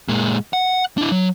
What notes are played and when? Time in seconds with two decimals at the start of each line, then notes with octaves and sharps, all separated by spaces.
0.08 A#2 G#3
0.53 F#5
0.98 D4 E4
1.12 F#3